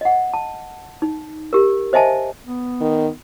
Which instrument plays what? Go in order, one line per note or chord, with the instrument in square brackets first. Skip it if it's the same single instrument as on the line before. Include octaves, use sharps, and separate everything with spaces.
[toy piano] D#5 F#5
A5
D#4
G4 A#4
C5 D#5 E5 G#5 A5
[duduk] B3
[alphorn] D#3